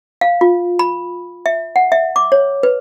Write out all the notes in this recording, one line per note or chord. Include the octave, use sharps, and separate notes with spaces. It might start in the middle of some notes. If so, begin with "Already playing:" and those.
F5
F4
B5
E5
F#5
E5
D6
C#5
B4